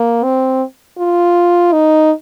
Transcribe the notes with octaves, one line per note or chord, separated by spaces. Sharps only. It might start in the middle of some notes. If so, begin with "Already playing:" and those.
Already playing: A#3
C4
F4
D#4